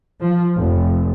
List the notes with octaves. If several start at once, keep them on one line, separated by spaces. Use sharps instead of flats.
F3
F1